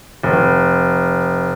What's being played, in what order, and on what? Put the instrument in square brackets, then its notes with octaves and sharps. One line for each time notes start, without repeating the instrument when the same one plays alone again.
[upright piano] F1